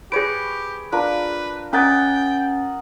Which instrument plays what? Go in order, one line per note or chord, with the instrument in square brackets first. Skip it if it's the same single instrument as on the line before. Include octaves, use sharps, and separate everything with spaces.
[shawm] G4 [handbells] G#4 D7 [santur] B4 C#5
[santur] D4 F4 A#4 [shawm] B4
[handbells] C#4 A6 [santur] A#4 D#5 F#5 [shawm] G5